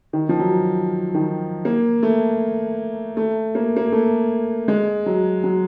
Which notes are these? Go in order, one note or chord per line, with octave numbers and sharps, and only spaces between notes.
D#3
F3
F#3
D#3
A#3
A3
A3
A#3
A#3
A3
G#3
F#3
F#3